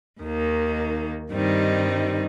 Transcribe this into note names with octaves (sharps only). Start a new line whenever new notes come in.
D#2 D#3 A#3
G2 D#3 G3 C4 D#4